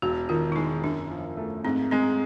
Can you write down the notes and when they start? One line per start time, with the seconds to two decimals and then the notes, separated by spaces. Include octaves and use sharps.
0.02 E1 F#4
0.29 D#3 F4
0.52 E4
0.56 G#3 D#4
0.84 F#2 D4
1.11 F3
1.37 A3
1.64 G#2 C4
1.91 G#3 C4